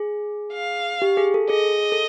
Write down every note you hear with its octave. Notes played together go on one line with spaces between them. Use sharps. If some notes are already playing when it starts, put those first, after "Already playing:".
Already playing: G#4
F5
G4
G#4
A4
G#4 D#5
A4